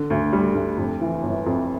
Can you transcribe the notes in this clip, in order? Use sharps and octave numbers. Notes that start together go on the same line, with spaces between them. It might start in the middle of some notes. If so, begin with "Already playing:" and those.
Already playing: D3
D2
G3
D2
F2
E3
G1
F2